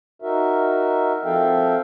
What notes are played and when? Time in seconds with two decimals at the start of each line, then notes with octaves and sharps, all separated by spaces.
0.22 D#4 F#4 A#4 E5
1.24 F3 C4 A4 E5 F5 G5